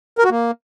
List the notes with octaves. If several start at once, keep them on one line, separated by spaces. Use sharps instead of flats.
A#4
F#4
A#3